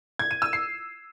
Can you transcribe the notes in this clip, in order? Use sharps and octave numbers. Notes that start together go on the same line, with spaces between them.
G#6
D#7
E6
C7